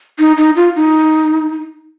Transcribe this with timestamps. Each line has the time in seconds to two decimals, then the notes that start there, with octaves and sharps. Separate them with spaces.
0.19 D#4
0.37 D#4
0.56 F4
0.75 D#4